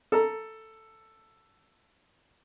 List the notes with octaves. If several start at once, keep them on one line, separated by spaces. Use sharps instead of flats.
A4 A#5